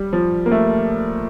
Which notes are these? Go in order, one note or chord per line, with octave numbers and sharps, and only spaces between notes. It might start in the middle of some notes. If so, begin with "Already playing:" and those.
Already playing: G3
F3
A#3
A3